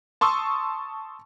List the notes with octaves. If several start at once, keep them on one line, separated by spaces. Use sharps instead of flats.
A5 C6 C#6 D#6 E6